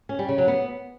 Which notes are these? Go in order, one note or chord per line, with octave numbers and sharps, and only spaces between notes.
C#4
G3
C#3
F#3
B3